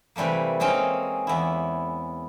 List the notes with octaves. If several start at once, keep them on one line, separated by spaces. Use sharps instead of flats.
C3 E3 G3 A3 A#3
G#3 A#3 C4 C#4 D#4
E2 E4